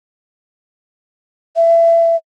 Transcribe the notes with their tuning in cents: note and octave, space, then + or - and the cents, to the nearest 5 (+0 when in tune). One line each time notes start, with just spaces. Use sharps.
E5 +25